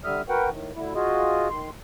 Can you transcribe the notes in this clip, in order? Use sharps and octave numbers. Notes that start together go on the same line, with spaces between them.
D3 G3 E5 D#6 F6
F#4 A#4 B4 F#5 G5
A2 D#3
D2 D3 E4
F4 F#4 G#4 D#5
D#3 C6